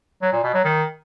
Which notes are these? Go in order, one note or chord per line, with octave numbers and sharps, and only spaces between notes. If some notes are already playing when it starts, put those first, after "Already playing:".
F#3
A#2
B2
F#3
D#3